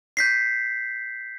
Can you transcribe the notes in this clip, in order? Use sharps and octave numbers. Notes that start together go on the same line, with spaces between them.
G6 B6 C7